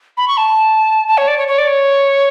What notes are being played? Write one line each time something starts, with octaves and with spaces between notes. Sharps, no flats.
B5
C#6
A5
A5
C#5
D5
C#5
C#5
D5
C#5